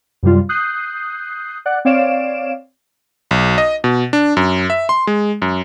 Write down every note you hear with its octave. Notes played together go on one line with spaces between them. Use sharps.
F#2 C3 G3 F4
D#6 F#6 G6 C7
D5 F#5 F#6
C4 C#5 D5 F5 D7 E7
B1
D#5
B2
D4
F#2
E5
C6
G#3
F#2